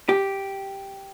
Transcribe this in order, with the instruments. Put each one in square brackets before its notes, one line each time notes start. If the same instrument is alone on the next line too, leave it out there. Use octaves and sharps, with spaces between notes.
[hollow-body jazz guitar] G4